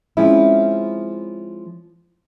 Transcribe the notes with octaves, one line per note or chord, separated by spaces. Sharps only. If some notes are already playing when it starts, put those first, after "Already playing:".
F3 G#3 C4 C#4 E4